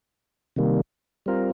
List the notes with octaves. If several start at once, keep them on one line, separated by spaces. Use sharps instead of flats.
C3 D#3 G3 A#3
G3 C4 F4 A#4